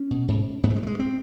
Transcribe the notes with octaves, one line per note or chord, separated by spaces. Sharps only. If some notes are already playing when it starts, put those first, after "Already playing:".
Already playing: C#4
B2
G#2
G#2 B3
A3
G#3
A3
G#3
C4